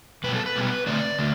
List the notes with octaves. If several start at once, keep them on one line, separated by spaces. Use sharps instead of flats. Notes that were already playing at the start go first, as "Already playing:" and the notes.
B2 G3 B3 B4
A4
B4
B2 G3 B3
D3 A3 C4 D5
D3 A3